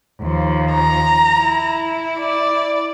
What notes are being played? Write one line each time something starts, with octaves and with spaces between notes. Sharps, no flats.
D#2 F3
A#5
E4
D5